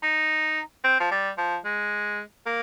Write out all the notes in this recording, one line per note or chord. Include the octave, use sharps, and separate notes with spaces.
D#4
C4
F3
G3
F3
G#3
A#3